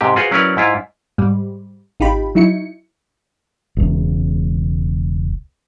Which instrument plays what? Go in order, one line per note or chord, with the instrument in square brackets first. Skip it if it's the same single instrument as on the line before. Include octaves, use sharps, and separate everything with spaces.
[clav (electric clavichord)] G#2 C3 G4
F4 F#4 G#4 B4 C5
F#3 C#4 E4 A#4 B4 D5
G#2 E4 F4
[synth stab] G#2 G3
G#1 D#4 F4 G4 B5
F#3 D#4 E4 C#7
[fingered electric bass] E1 C#2